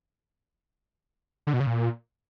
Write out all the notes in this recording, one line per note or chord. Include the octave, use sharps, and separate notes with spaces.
D3
B2
C#3
A#2